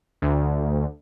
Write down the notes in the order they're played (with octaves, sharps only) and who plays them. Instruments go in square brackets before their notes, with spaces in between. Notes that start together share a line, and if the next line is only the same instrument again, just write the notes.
[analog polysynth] D2